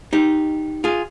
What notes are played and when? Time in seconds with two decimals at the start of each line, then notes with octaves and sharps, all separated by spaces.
0.13 D#4 G4
0.84 F4 G#4